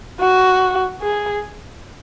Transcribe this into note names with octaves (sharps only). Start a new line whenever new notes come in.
F#4
G#4